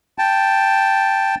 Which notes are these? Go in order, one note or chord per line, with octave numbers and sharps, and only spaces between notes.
G5 A5